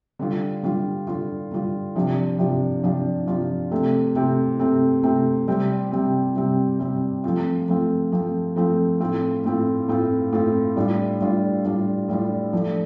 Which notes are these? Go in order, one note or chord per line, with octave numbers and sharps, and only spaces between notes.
D3 G3 F4
D3 G3 F4
D3 G3 F4
D3 G3 F4
C3 F3 D4 F4
C3 F3 D4 F4
C3 F3 D4 F4
C3 F3 D4 F4
C3 A3 C4
C3 A3 C4
C3 A3 C4
C3 A3 C4
C3 G3 C4
C3 G3 C4
C3 G3 C4
C3 G3 C4
F3 A3 C4 F4
F3 A3 C4 F4
F3 A3 C4 F4
F3 A3 C4 F4
A2 A3 C4 F4
A2 A3 C4 F4
A2 A3 C4 F4
A2 A3 C4 F4
A2 G3 D4 F4
A2 G3 D4 F4
A2 G3 D4 F4
A2 G3 D4 F4
F3 A3 D4